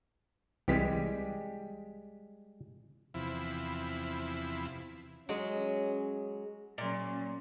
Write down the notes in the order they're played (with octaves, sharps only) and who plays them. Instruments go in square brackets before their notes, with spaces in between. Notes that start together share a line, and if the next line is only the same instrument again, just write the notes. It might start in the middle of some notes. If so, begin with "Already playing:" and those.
[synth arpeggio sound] C2 E3 B6 [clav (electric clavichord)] G3 G#3 G4
[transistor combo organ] E2 C3 F3 E4 B5
[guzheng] F#3 G#3 [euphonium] C#4
[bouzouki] A#2 [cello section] F#3 A#3 C#4